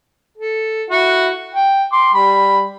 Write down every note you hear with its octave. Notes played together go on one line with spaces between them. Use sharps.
A4
E4 F#4 F#5
G5
C6 D6
G3 B5